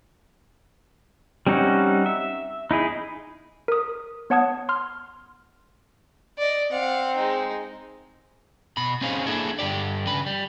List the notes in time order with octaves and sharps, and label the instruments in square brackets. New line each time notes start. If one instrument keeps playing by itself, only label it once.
[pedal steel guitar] G3 C4 C#4 D#4 F#4
E5
D#4 E4 G#4
[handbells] A#4 D#6
B3 C#5 F#5 A5 D#6 G#6
C6 F6
[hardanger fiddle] D5 D#5
[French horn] C4 [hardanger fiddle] F5 F#5
[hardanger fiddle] G#3 D#4
[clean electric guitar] B2 B5
C4 C#4 D#4 G#4 C5 F5
A#3 D4 E4 G#4 A4
G2 D3 G4 D5
C#3 B4 B5
G3